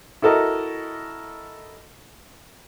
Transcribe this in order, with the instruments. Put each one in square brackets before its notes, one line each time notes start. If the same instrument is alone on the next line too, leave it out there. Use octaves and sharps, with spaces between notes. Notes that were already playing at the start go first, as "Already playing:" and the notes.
[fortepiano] E4 F#4 A4 A#4 D#5